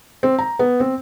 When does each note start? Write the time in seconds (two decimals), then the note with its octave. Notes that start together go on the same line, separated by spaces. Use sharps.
0.23 C4
0.39 A#5
0.59 B3
0.80 C4